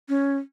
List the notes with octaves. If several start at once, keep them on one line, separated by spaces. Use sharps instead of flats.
C#4